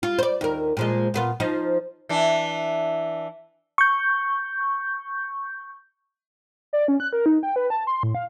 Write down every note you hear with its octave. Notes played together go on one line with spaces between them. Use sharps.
F4
C5 D5
D#2 A#4
A#2 F3 G#3
A#2 B3 F4
F3 D#4
E3 D4
C#6 G6
D5
C#4
F#6
A#4
D#4
G5
B4
A5
C6
A2
F5